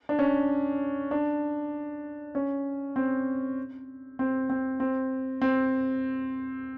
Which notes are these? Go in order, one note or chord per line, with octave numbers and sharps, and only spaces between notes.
D4
C#4
D4
C#4
C4
C4
C4
C4
C4